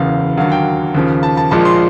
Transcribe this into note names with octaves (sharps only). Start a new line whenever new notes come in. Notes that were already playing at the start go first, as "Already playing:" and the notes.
Already playing: F#1 E2 C#3 F5
D#2 D3 F#3 F5
G5
D#2 C#3 F3
A5
A5
A#1 A#2 F3 G#3 A5
C6